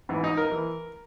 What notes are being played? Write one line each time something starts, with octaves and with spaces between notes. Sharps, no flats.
G#2 E3
D#4
A#4
E3